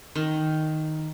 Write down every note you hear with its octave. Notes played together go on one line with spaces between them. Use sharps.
D#3